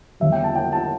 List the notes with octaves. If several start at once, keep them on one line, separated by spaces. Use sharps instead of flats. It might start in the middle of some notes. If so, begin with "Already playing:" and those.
E2 D3 G3 E5
G5
A5
G5
A5